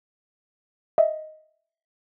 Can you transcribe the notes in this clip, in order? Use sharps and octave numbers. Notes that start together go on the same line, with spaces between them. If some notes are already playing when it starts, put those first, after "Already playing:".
D#5 E5